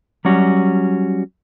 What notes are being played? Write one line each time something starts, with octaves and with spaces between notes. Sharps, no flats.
F#3 G3 C#4 F#4